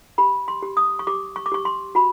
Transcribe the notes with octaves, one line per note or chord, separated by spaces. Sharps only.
G4 B5
C6
G4
D#6
C#6
G4 D6
C#6
D6
G4 C#6
C6
F#4 B5